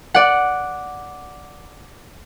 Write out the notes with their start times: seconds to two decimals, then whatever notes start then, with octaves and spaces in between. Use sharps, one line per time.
0.15 D5 F#5